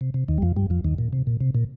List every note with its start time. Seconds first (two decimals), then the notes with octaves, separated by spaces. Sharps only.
0.01 C3
0.14 C3
0.28 D#2 D#3
0.38 G3
0.42 F2 F3
0.56 G2 G3
0.70 F2 F3
0.85 D#2 D#3
0.98 A#2
1.13 C3
1.27 A#2
1.41 C3
1.55 A#2